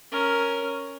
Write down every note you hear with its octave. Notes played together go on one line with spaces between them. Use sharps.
C#4 A#4